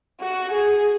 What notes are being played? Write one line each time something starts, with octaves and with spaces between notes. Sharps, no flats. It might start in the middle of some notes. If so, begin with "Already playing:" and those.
F#4
G#4